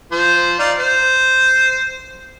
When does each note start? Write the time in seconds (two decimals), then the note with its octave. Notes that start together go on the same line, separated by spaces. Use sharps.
0.12 F3 C5
0.59 D#4 D5 F5
0.80 C5